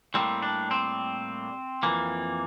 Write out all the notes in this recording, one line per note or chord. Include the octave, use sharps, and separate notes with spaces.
A2 G3 A#3 C4
D4
C4
F2 E3 A#3